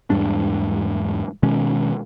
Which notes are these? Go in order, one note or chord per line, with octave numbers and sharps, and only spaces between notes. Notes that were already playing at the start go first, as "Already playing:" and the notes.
E2 G#2 G3 D4
B2 D#3 G#3 C#4